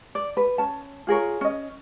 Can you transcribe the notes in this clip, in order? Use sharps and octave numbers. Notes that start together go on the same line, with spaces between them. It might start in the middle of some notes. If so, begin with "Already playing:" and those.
D5
B4
C#4 A5
F4 G#4 A#4 C#5
C#4 D#5